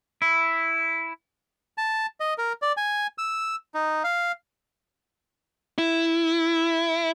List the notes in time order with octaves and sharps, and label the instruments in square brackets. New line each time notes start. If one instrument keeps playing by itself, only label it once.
[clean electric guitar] E4
[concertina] A5
D#5
A#4
D5
G#5
E6
D#4
F5
[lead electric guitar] E4